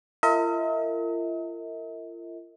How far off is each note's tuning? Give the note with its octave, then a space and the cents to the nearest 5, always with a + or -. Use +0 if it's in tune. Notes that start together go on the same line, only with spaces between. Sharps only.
F4 -40 A#4 -35 D#5 +45